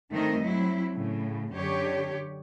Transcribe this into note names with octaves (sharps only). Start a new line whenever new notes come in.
G2 D#3 A3 C4 A#4 D#5
F#3 C4 E4
A2 C#3
F#2 D3 G4 C#5